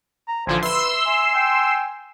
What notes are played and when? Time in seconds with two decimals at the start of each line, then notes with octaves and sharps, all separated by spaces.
0.28 A#5
0.47 A1 D3 F3 C5 G#5
0.62 B4 E5 C6 E6
1.06 E5 G#5
1.35 G5